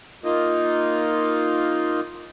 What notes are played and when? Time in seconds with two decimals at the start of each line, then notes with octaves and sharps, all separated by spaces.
0.24 A#3 D#4 F4